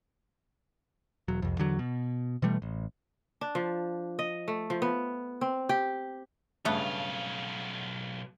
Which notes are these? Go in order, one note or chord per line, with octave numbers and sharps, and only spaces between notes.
E1 F#3
C2 F2
E2 D3 F#3
B2
B2 E3 G3 A3
A1
D4
F3
D#5
A3
F3
B3
C4
G4
B1 G2 C#3 A3 B3 F4